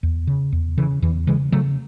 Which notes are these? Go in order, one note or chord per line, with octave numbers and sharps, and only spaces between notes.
E2
C#3
E2
C#3 E3
E2 E3
C#3 E3 G#3
C#3 F#3 A3